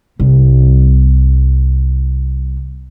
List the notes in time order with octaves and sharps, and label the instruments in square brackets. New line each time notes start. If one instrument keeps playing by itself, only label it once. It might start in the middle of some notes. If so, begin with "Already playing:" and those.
[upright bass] C2 G3